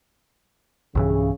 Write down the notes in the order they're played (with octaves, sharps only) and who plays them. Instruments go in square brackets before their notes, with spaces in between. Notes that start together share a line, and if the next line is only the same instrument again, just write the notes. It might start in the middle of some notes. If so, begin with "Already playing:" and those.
[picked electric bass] B1 G2 E3 [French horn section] C#3